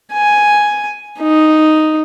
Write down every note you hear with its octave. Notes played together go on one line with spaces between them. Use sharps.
G#5
D#4